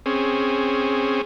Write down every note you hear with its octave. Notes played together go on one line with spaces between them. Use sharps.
C4 C#4 G#4